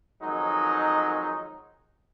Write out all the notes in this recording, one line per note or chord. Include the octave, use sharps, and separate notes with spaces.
F2 D#3 F#3 G#3 D#4